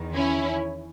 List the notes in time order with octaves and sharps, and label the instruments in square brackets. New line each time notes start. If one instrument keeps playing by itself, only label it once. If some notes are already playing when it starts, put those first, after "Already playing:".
Already playing: [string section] E2 D#3
C#4 E4